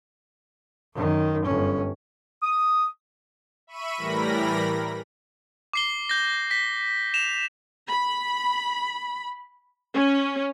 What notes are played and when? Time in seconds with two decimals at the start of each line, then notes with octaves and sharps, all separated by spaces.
0.94 F#2 D#3
1.45 G1 C#4
2.42 D#6
3.67 E5 B5 C#6 D#7
3.98 A2 E3 G3 A#4 B5 A#6
5.73 D6 C7 G7
6.09 G6 A#6
6.51 B6
7.14 E7 F7
7.90 B5
9.94 C#4